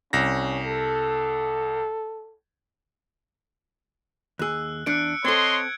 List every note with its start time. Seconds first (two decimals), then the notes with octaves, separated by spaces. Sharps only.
0.13 C2 C#4 A#6
0.66 A4
4.39 D#2 G#4 E6 F#6
4.86 E2 D4 F#6 C#7 D7
5.25 C4 A4 C#5 D#5 C6 G#6